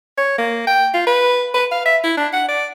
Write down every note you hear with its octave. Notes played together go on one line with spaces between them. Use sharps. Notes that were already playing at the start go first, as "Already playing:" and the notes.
C#5
A#3
G5
F4
B4
B4
F5
E5
E4
D4
F#5
D5